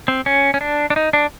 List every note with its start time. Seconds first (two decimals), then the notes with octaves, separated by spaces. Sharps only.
0.08 C4
0.26 C#4
0.54 C#4
0.61 D4
0.90 D4
0.96 D#4
1.13 D4